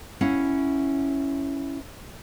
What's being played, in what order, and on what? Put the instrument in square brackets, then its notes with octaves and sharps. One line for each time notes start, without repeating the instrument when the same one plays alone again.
[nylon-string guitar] C#4 E4 F5 F#5